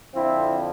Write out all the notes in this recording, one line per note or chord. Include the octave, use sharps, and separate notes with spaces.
F2 D3 F3 C4 E4